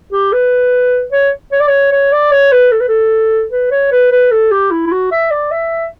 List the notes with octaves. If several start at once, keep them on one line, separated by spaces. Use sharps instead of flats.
G4
B4
C#5
C#5
D5
C#5
C#5
D5
C#5
B4
A4
B4
A4
B4
C#5
B4
B4
A4
G4
E4
E4
F#4
E5
D5
E5